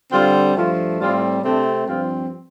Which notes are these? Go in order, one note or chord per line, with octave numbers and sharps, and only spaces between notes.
D3 G3 C4 F4
G2 F3 A3 F4
A2 G3 C4 F4
C3 A3 C4 D4
G2 F3 C4 F4